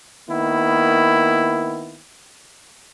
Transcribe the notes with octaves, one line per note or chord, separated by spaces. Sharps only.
D#3 A#3 B3 E4